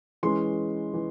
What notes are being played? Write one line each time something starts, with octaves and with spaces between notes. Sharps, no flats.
E3 G#3 C#4 C6
E3